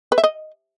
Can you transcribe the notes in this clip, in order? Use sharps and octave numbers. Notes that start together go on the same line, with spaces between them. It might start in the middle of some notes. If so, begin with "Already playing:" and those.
B4
E5
D#5